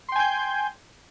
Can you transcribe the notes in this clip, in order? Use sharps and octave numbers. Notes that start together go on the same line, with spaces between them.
G5 G#5 C6 G6